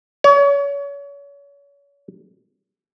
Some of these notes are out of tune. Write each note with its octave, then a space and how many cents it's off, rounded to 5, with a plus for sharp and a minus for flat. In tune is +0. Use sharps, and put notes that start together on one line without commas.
C#5 +35